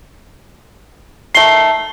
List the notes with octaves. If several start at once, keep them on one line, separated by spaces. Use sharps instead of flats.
D#3 A3 C7 G7